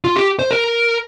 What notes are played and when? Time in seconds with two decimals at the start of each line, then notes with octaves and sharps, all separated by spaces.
0.04 F4
0.16 G4
0.39 C5
0.51 A#4